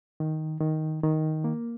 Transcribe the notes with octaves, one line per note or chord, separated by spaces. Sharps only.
D#3
D#3
D#3
A#3